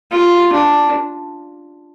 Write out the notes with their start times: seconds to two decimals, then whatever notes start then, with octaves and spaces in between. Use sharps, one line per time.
0.12 F4
0.52 D4